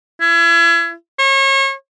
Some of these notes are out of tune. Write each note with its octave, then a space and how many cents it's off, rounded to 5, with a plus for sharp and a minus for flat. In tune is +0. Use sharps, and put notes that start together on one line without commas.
E4 +35
C#5 -35